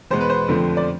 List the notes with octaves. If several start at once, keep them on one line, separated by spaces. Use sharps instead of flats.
E2 B2 G#3 B3 C5
B4
C5
F2 D3 F3 A3 C4
D5